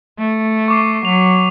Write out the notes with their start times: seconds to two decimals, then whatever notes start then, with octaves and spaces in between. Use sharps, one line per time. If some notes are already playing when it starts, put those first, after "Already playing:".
0.18 A3
0.68 C#6 D6 C7
1.05 F#3 F7